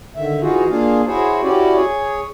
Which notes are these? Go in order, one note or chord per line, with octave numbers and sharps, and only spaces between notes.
D3 D#3 E5
E3 D#4 F4 F#4 G#4
A#3 D4 F4 G#4 F5
E4 F#4 G#4 C5 C#5
C#4 E4 F#4 G4 D5
G#4 C#5